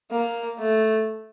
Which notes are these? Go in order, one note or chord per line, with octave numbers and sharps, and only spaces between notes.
A#3
A3